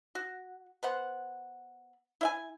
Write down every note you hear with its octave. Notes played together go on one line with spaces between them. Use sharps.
F#4
B3 C5 F#5
E4 E5 G#5